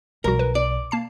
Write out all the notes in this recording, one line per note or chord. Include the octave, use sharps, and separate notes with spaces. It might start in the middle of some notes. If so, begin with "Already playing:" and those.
B1 F3 G3 F#4 A#4
B4
D5
A#3 A5 C7